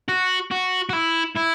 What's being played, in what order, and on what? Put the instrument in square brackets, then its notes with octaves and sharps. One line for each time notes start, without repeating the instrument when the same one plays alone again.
[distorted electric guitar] F#4
F#4
F#4
E4
E4